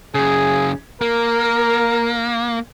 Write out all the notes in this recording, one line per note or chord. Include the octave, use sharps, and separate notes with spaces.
F#2 C#3 G#4
A#3 A#4